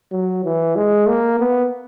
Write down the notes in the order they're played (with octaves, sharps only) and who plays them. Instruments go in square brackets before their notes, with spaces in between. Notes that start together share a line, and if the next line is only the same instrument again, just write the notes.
[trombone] F#3
E3
G#3
A#3
B3